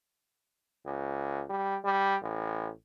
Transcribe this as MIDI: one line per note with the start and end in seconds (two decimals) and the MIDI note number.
0.85 1.43 37
1.49 1.77 55
1.85 2.15 55
2.22 2.70 33